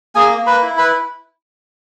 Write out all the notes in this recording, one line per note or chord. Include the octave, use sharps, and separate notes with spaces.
A#3 G#4 G#5
A#3
B4 B5
E4
B4 B5